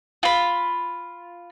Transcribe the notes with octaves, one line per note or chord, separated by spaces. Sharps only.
F4 B5